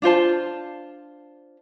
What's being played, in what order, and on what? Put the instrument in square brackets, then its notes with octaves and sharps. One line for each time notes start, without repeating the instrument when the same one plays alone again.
[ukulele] D4 F4 C5 A5